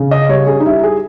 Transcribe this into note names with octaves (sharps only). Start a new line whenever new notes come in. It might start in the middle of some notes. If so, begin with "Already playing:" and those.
Already playing: C#3
D#5
G3 C#5
G#4
D#4
G3 E4
G#4